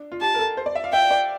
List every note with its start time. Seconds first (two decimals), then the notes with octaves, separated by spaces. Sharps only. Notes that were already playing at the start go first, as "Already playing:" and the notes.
Already playing: D4
0.12 F4
0.21 G4 A5
0.35 A#4
0.39 A4
0.57 C5
0.66 D5
0.75 E5
0.84 F5
0.93 E5 G5
1.11 D5